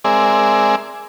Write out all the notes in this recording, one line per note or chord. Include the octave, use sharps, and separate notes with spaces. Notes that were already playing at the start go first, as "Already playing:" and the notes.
G#3 C4 G#4 A#4 D5 E5